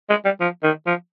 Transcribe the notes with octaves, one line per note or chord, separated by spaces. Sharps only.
G#3
G3
F3
D#3
F3